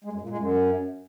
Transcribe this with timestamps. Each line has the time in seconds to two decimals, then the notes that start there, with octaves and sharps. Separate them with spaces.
0.04 G#3
0.13 F#2
0.21 A#2
0.29 G#3
0.38 F#2